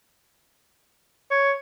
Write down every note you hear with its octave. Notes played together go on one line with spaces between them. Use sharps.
C#5